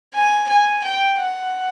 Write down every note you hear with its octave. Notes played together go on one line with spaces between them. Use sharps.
G#5
G#5
G5
F#5